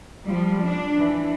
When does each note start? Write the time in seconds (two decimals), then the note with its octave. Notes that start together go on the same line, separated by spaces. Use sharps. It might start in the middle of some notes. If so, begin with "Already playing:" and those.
0.23 F3 G3
0.61 D4
0.97 E3